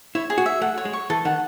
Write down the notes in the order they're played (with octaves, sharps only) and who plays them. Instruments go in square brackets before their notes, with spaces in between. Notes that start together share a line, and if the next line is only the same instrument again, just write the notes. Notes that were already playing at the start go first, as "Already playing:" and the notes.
[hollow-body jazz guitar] E4 [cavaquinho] C#5
[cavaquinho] G#4
[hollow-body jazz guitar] F#4
[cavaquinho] E5
[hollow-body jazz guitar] A3 [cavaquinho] F#5
[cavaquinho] C#5
[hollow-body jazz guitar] G#3
[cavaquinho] C#6
[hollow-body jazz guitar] E3 [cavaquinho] A4
[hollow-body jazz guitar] D#3 [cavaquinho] F#5